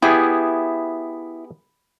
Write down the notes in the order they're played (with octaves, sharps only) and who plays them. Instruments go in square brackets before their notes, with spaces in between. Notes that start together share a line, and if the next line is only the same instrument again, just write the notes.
[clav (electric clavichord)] B3 G4 G#4 [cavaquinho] E4